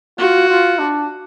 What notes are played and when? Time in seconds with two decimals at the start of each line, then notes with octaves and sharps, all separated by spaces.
0.18 F4 F#4
0.49 F4
0.79 D4